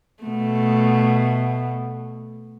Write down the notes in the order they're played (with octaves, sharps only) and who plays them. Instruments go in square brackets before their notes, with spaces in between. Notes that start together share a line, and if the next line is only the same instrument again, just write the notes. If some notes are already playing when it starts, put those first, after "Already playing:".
[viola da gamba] B2 A3